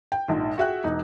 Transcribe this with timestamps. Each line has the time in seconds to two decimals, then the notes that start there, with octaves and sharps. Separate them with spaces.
0.12 G5
0.28 A#1 G#2
0.58 F#4 G#4 E5 F#5 G5 F#6
0.84 E1 D#4